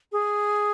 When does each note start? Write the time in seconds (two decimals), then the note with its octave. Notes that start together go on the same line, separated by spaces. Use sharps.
0.12 G#4